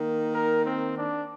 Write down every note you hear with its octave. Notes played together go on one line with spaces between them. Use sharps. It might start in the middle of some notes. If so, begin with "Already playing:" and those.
Already playing: D#3 A#3
A#4
C4
D4